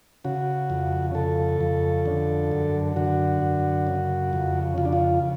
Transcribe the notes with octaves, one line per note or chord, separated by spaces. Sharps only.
C#3 F#4
F2
C#3 A4
F2
D3
F#2
D3 F#4
F#2
C#3
F2
C#3 F4
D4
F4